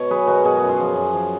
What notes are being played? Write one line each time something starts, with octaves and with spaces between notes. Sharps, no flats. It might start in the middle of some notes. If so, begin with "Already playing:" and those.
Already playing: B2 C#5
F#3 G#4 B4
B2 F#4 A#4
B2 G#4
F#4
F#2
F4 G#4
F3
F#2
F3